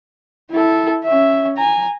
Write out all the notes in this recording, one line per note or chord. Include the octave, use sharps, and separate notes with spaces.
E4 A4
C#4 E5
G#5 A#5